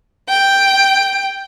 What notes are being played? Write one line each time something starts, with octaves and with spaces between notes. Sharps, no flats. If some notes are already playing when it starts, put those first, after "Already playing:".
G5